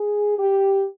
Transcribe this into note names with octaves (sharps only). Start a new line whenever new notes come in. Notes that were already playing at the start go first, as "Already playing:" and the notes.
Already playing: G#4
G4